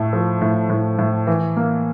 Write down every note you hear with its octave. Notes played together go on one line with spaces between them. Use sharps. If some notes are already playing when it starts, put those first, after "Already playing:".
Already playing: A2 A3
F3
A2
A2
A2
E3
A#3